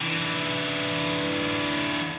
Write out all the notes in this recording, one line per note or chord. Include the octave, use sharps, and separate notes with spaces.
D3 E3